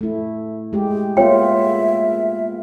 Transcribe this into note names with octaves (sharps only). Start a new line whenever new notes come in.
A3 E4
G#3 G4
A#3 B3 F4 C#5 E5 G5